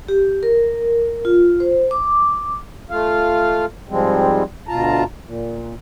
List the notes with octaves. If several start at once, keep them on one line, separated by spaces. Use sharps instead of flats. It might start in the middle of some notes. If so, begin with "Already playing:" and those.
G4
A#4
F4
C5
D6
A3 F4 F5
G#2 F3 G3 G#3 C4
D2 B2 F4 A5 A#5
A#2